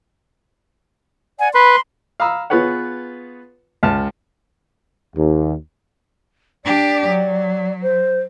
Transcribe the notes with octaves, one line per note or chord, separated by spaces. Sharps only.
D5 F#5 G#5
B4 B5 C6
F5 A#5 B5 D#6 E6
B3 F4 G#4 B4 C#5 F#5
C#2 A5 F6
D#2
D4 G4 D5
F#3
C5